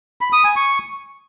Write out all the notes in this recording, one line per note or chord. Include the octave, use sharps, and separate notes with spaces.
B5
D#6
G#5
C#6